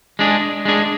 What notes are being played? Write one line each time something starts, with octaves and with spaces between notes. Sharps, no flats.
G#3 D4 G#4
G#3 D4 G#4